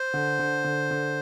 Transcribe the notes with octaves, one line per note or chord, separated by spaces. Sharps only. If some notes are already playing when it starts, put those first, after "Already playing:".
Already playing: C5
D3
D3
D3
D3